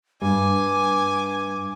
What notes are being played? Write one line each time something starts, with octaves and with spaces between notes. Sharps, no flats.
G2 G3 G#5 D6